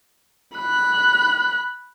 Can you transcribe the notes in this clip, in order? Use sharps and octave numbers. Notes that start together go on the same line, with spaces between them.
B5 F#6